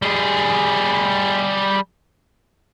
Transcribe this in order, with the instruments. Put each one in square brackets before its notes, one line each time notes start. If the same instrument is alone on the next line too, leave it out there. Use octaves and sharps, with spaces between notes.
[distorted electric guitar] G3 G#4